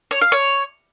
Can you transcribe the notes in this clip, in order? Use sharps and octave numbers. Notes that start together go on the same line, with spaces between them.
C#5
F5
C#5